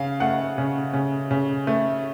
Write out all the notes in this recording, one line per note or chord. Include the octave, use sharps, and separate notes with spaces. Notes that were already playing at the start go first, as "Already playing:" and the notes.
Already playing: C#3 F5
A3 F#5
C#3
C#3
C#3
A3